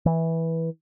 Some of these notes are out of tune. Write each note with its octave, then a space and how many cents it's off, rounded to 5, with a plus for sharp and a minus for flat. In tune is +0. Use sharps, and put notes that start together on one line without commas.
E3 -10